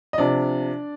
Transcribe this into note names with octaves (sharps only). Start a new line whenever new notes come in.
D#5
C3 F3 D4 D5